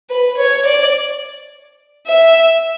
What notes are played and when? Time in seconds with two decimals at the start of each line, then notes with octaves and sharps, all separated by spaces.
0.10 B4
0.38 C#5
0.66 D5
2.08 E5